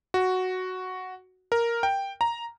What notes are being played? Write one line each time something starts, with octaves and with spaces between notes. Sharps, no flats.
F#4
A#4
G5
A#5